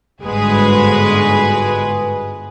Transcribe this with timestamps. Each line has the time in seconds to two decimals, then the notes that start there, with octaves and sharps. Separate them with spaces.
0.22 G1 G#2 G#3 F#4 G#4 B4